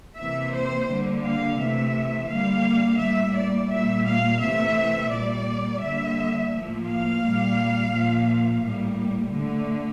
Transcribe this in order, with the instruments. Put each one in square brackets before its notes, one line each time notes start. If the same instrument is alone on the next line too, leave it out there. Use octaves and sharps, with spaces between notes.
[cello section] C3 E3 A#3 E5
C5
D3 G3 A#3
F5
C3 E3 A3 E5
D3 G3 A#3 F5
A2 G3 A#3 E5
D5
A#2 G3 A#3 E5
F5
C3 E3 A3 E5
A#2 G3 A#3 D5
D3 G3 A#3 E5
A2 F3 A#3
F5
A#2 G3 A#3
A#2 F3 A#3
A2 G3 A#3
D3 A3